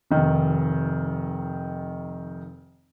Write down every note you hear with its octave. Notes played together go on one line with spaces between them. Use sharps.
F1 D#3